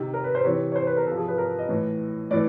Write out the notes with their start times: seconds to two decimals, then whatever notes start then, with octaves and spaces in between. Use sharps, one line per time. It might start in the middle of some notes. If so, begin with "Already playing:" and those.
Already playing: C3 D#3
0.14 A#4
0.24 B4
0.35 C5
0.45 C3 E3 C#5
0.72 C#5
0.76 C5
0.87 B4
0.97 A#4
1.07 C3 F3 A4
1.17 G#4
1.28 B4
1.38 A#4
1.59 D#5
1.69 A2 E3
2.31 A2 E3 D5